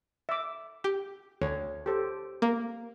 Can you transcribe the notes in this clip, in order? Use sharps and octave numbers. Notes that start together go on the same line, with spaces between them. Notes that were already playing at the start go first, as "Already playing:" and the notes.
E5 D6
G4
D2 C#5
G4 A4 C5
A#3